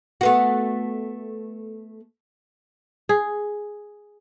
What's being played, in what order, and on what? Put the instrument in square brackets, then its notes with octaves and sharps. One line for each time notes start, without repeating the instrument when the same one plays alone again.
[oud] A3 B3 F#4
[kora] G#4